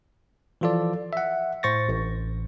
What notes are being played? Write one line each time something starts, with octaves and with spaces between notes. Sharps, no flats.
E3 F3 F4 A4 D5
E5 F#5
A2 C5 C#6 A6 A#6
A1